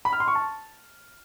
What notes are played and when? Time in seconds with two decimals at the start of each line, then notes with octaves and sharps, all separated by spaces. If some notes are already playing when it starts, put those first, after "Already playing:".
0.05 B5
0.13 F6
0.20 C6
0.28 C#6
0.35 A5